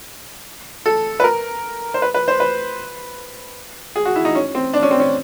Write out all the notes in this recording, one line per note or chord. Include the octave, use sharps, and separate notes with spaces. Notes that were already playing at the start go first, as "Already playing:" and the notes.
A4
B4
A#4
C5
B4
B4
C5
B4
G#4
F#4
E4
D#4
C#4
C4
D4
C#4
C4
C#4